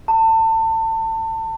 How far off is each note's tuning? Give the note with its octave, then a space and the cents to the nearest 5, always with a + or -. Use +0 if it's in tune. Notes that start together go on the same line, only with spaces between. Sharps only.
A5 +30